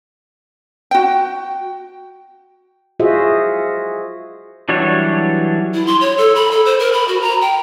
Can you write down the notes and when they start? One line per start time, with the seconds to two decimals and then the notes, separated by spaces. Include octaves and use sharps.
0.91 F#4 G5
3.00 F4 F#4 G#4 C5 D#5 E5
4.69 E3 F#3 G3 D4 C#5
5.74 E4
5.87 C6
6.01 C#5
6.18 A4
6.35 B5
6.51 A4
6.66 C5
6.79 A#4
6.93 B5
7.08 F#4
7.21 A#5
7.41 G5